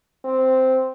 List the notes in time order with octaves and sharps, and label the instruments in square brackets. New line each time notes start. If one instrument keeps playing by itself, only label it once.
[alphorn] C4